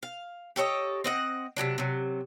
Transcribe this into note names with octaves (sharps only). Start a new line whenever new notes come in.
F5
G4 A4 C#5 D#5
C4 D#5 F#5
C3 D#3 F#3 D4
C3 F#3